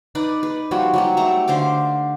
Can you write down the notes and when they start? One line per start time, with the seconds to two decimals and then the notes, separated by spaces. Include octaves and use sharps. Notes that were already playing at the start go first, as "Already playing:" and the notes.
0.15 D#4 B4 D5
0.43 B4
0.71 F3 G3 F#4
0.94 F#3 G3 G4
1.17 A3 A5 A#5
1.48 D3 C5 F5 D6